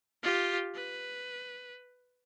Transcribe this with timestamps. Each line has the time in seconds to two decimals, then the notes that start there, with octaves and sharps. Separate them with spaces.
0.23 F4 G4
0.75 B4